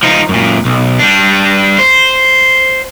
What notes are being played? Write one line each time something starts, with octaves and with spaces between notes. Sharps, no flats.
F3 D#4
F#2 A#2
B1
G3 D4
C5